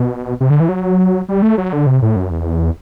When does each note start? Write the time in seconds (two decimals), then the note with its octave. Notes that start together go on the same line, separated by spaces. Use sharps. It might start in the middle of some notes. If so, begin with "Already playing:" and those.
Already playing: B2
0.40 C3
0.50 D3
0.60 E3
0.69 F#3
1.29 G3
1.42 A3
1.58 F#3
1.73 D3
1.87 C3
2.02 A2
2.16 F#2
2.31 E2